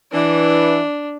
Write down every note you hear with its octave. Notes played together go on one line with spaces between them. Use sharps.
E3 D4